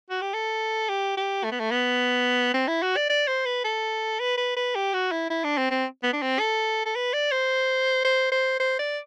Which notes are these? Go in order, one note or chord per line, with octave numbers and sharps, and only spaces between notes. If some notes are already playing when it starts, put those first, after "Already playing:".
F#4
G4
A4
G4
G4
A3
B3
A3
B3
C4
E4
F#4
D5
D5
C5
B4
A4
B4
B4
B4
G4
F#4
E4
E4
D4
C4
C4
B3
D4
C4
A4
A4
B4
D5
C5
C5
C5
C5
D5